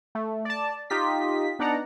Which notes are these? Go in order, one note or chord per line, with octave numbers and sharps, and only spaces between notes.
A3
D5 A5
D#4 F4 G4 D#5 B6
B3 D4 D#4 D5 F#5 A#5